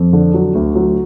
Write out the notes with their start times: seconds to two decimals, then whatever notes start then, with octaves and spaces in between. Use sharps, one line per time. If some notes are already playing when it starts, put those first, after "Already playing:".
Already playing: F2
0.13 D3
0.34 F#3
0.55 D2
0.75 F#3